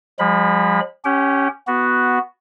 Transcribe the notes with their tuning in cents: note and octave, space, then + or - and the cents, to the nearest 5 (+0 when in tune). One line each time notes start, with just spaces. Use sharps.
F3 +30 G#3 -40 B5 -10
C#4 +0 G4 +5 G5 -40
B3 +0 F#4 +0